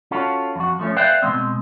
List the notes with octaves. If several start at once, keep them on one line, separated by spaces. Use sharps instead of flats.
C#4 F4 F#4 A4
F2 F#4
F3 A3 C#4
B4 C5 D5 E5 F5 G5
B2 D3 G#3 C4